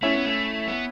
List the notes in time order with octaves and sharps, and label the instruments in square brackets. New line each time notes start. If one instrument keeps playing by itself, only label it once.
[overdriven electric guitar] A3 [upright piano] C#4 E4
[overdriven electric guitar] B3
A3
B3